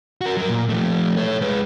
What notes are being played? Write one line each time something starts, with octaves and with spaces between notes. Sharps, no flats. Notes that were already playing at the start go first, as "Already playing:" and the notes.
F#4 A#4
F#3 A#4
A#2
F3 A3
A4 C#5
G#3 B4